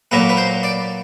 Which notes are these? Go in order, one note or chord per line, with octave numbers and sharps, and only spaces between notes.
A#2 F#3 A#3 B4
B4
C5
D5